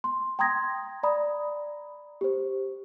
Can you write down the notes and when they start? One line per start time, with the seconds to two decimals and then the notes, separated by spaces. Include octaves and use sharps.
0.04 C6
0.39 G5 A#5 C6 D#6 G#6 A#6
1.03 D5 A#5 B5 D#6
2.21 G4 C5